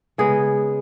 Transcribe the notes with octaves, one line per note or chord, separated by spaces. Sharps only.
C#3 G#3 B3 G#4